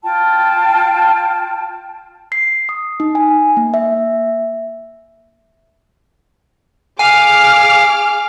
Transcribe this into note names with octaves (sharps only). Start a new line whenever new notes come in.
F4 G5 A5
C7
D#6
D#4
G#5
A#3
E5
G#4 F5 G#5 D6 F6